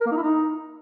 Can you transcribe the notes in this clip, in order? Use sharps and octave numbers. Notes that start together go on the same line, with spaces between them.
A#4
A#3
D#4
E4
D#4